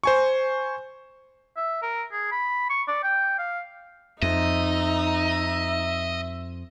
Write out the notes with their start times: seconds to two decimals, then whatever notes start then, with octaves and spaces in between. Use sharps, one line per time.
0.04 C5 G#5 C#6
1.57 E5
1.82 A#4
2.12 G#4
2.32 B5
2.70 C#6
2.88 D5
3.04 G5
3.39 F5
4.22 F2 D#4 D#5 E5 A#5